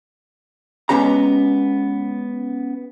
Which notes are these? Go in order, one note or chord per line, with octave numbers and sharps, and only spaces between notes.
G#3 B3 C#4 G4 A#5